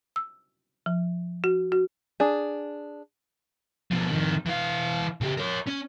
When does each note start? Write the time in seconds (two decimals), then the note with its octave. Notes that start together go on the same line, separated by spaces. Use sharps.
0.16 E6
0.86 F3
1.44 F#4
1.72 F#4
2.20 D4 G#4
3.91 B2 F3
4.10 F2 D#3
4.46 E3 F5
5.21 C#3 G4
5.37 A#4 C#5
5.67 C#4